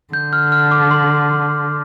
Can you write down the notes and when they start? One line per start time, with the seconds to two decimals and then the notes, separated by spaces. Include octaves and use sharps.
0.13 D3 G6
0.33 F6
0.52 F6
0.71 D6
0.91 C6